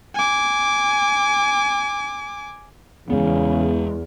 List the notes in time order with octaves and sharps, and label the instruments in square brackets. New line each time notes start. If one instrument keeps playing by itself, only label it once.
[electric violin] G#5 D6
[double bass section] E2 [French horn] C#3 [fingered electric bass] G#3 B3